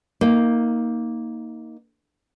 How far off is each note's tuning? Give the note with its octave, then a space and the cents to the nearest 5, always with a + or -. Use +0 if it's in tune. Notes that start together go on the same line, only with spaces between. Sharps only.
A#3 +0 D#4 +20